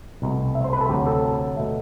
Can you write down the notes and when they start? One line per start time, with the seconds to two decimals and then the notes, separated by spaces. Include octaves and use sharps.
0.22 C2 B2 A3
0.55 E5
0.64 C5
0.73 B4
0.81 A4
0.89 D2 C3 F#3 G4
1.06 A4
1.57 B2 A3